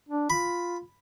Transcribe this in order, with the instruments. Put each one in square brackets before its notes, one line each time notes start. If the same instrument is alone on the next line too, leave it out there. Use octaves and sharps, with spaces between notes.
[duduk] D4
[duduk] F4 [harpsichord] B5